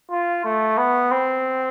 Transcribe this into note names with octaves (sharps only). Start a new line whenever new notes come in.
F4
A3
B3
C4